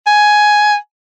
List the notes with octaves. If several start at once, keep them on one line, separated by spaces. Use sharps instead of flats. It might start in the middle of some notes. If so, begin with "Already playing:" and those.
G#5